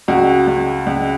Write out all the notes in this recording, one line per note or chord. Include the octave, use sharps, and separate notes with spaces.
C#2 F#4
C#2
C#2